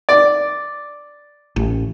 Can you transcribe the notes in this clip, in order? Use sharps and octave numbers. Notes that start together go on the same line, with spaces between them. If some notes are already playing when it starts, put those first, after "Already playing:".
D5
A1